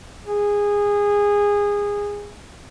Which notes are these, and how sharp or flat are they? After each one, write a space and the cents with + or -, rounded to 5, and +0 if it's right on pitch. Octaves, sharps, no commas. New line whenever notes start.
G#4 -20